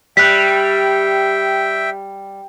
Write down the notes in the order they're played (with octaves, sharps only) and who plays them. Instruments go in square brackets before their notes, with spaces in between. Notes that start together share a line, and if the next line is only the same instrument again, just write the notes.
[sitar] G3 [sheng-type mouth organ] E5 G5 [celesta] F#6 B6